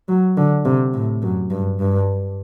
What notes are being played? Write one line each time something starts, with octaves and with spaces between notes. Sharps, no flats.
F#3
D3
C3
A2
F#2
G2
G2